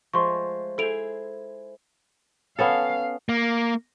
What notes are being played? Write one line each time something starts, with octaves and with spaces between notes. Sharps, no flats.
F3 G#3 A3 C6 C#6
E4 G#4 A4 C5 D7 F7
B3 C#4 A4 F5
A#3